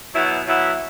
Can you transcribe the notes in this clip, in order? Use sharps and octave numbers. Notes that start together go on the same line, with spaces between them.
B2 F#3 B3 E4
B2 F#3 B3 E4